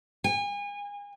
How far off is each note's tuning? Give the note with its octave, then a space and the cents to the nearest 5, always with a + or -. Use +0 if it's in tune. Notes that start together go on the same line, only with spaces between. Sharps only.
G#5 -35